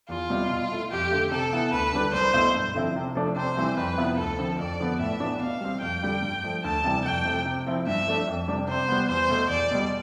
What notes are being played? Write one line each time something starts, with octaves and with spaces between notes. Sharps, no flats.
E2 F4
B2 G3 C4 E4
B2
A3 E4
F2 G4
D3 A3
C3 A4
E3 B3 E4
D2 B4
D3 G3 D4
C2 C5
B2 A3 E4
G2
D3 F3 C4 E4
C3
F3 A3 D4
C3 C5
E3 G3 C4
F2 B4
C3 F3 B3 E4
D2 A4
D3 F3 C4
F2 D5
D3 F3 B3
A2 E5
E3 B3 D4
B2 F5
G3 C4
F2 G5
D3 G3
G2
F3 A3
D2 A5
C3 E3 G3
F2 G5
C3 F3 A3
C3
F3 C4 E4
G2 E5
F3 A3 D4
F2
C3 G3 D4
C3 C5
G3 B3
E2 C5
B2 A3
E2 D5
B2 G3